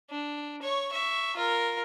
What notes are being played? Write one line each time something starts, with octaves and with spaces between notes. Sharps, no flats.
D4
C#5 C#6
E5 C#6
F4 A#4